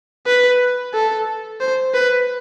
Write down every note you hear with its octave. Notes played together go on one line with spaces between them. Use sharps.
B4
A4
C5
B4